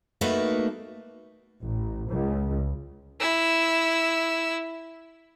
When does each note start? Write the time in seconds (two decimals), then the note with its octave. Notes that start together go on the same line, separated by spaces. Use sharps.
0.21 A3 A#3 D#4 F#4 B4 E5
1.62 A1
2.10 C#2
3.20 E4 E6